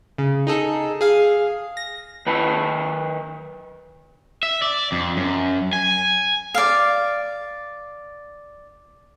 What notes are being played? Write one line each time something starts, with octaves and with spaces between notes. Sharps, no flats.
C#3
D#4 G#4 A4
G#4 F5
A#6
D#3 B4 G5 A5 B5
E5
D5
F2
F#2
G#5
D5 F5